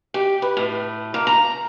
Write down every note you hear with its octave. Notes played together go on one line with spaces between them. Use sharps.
G4
B4
A2
A#3
A#5